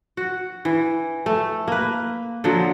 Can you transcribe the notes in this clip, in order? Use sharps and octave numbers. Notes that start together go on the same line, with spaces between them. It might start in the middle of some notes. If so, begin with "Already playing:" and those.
F#4
E3
A3
A#3 B4
D3 F3 F#3